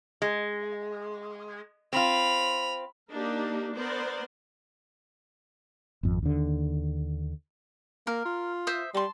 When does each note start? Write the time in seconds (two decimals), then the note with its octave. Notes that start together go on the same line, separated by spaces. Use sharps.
0.22 G#3
1.93 C4 F4 B5 F7
3.11 A#3 D4 D#4 G4 A#4
3.75 B3 A#4 C5 D5
6.03 G#1 F2
6.23 D#2 D3
8.07 A#3 A#4
8.25 F4
8.67 C5 E5 D#6
8.94 G3 A5 C6